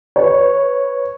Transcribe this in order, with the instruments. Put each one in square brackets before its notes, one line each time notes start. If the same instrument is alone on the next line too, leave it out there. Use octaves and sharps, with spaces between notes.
[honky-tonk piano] B4 C#5